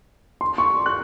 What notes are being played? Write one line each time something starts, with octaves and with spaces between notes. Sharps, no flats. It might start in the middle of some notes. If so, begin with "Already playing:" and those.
C6
C#6
F#6